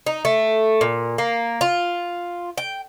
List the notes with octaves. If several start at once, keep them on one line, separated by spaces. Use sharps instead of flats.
D#4
A3
A#2
A#3
F4
G5